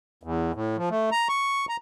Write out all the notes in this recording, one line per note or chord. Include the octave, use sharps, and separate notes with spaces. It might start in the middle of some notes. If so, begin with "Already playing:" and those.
E2
A2
F3
A3
A#5
C#6
A#5